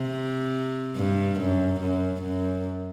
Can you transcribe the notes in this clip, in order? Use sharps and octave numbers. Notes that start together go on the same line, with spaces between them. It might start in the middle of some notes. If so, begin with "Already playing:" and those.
Already playing: C3
G2
F#2
F#2
F#2